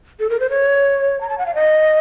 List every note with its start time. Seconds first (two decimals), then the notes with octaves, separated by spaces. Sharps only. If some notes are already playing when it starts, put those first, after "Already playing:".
0.20 A4
0.30 A#4
0.40 C5
0.50 C#5
1.21 A#5
1.29 A5
1.38 F#5
1.46 F5
1.55 D#5